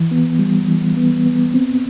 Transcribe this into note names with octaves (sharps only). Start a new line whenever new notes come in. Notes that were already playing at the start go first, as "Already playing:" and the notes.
Already playing: E3
B3
G3
E3
B3
B3
C4